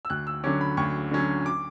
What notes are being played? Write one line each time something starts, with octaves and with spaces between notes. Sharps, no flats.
E6
D2 F#6
E6
D3 F#3 C#4 D6
B5
D2 C#6
D3 F#3 C#4
D6